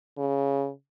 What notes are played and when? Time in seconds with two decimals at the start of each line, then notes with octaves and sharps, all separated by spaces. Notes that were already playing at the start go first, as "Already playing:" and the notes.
0.18 C#3